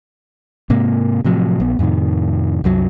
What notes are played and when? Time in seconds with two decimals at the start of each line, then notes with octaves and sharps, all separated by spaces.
0.70 G#2 C3 A#3
1.24 A2 C3 F3 F#3
1.60 A#1 B3
1.79 F2 A2 C3 D#3
2.64 C2 F#2 F#3